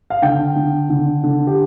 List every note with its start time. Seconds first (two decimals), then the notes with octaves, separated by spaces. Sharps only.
0.10 F5
0.22 D3 G5
0.56 D3
0.90 D3
1.24 D3
1.47 G4